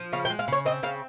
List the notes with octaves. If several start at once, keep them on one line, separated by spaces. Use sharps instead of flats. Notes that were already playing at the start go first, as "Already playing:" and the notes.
Already playing: F3
C#3 F5
G5
G#3
F5
C#3 C#5
C4 D#5
C#3 F5